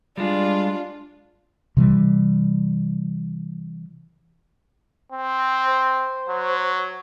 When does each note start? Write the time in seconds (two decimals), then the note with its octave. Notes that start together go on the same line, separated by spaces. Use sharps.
0.18 G3 G#3 D4 F4 G#4
1.77 C3 E3 G3
5.12 C4
5.64 C5
6.29 F#3